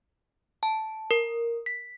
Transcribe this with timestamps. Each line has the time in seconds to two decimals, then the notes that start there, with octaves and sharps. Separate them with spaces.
0.63 A5
1.11 A#4
1.66 B6